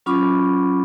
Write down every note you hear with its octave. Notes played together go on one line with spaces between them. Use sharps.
F#3 C#4 F4 B5 C#6 D6